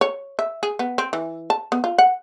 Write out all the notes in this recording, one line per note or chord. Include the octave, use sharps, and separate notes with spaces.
C#5
E5
G#4
B3
C4
E3
A5
B3
F4
F#5